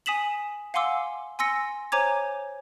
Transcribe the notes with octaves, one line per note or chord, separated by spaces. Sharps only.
G#5 D#6 B6 E7 F#7
F5 F#5 G#5 C6 D6 E6
G#5 C6 E6 A#6 C#7
C5 C#5 G#5 A#5 D6 G#6